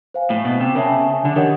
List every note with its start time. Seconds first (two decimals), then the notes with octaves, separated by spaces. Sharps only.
0.14 C5 F5 G#5
0.30 A2
0.45 B2
0.61 C3
0.75 C#3 A#4 C#5 E5 A5
1.25 D3
1.36 D#3 D4 G4 A#4 C#5 F#5